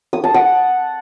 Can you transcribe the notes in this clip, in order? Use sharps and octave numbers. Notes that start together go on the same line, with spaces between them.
D#6
A5
F#5